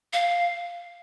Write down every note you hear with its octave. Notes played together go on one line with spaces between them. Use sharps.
F5